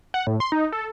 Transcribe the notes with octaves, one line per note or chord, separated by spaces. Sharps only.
F#5
A2
C6
D#4
A4